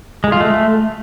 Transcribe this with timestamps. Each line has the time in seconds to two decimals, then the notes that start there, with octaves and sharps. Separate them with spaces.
0.24 G#3
0.32 F4
0.40 A3